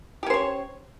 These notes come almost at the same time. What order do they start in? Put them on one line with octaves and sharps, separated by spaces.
G4 C#4 C5 C#5